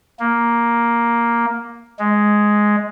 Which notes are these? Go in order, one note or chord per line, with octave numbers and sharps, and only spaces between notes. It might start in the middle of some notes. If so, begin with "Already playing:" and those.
A#3
G#3